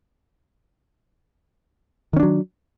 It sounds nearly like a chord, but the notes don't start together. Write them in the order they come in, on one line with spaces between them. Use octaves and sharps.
D#3 C#4 D4 F#3